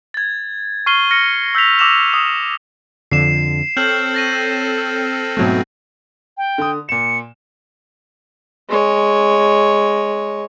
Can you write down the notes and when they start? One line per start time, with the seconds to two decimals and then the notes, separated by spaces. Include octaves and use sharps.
0.14 G#6 A6
0.86 C#6 F6 C7 D#7 G7
1.11 F6 A#6 C#7
1.55 E6 G6 B6 F7
1.79 D6 E6 A#6 E7 F7
2.14 D#6
3.11 F2 D3 C7 E7
3.77 C4 A4 C#5 F6 G6 F#7
4.14 A6 A#6 D#7
5.37 G#2 B2 F#3 A3 C4
6.37 G5
6.58 D3 D#6
6.89 A#2 C#7 E7
8.69 G#3 C#5